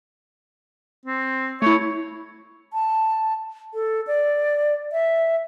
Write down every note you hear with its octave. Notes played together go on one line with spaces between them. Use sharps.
C4
A3 E4 C#5
A5
A4
D5
E5